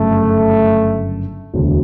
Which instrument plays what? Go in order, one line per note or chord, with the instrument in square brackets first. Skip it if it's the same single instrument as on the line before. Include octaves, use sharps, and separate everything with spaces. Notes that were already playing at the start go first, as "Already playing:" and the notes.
Already playing: [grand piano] G1 F#2 C#3 [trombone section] A3
[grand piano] E1 D2 D3